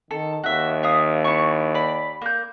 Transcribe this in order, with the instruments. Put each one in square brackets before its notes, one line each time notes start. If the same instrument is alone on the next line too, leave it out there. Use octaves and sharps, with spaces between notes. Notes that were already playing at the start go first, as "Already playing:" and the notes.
[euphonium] D#3 [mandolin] A4
[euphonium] D#2 [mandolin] F#4 E5
[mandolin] E5 F5 D#6
E4 C#6
D5 B5
A#3 G6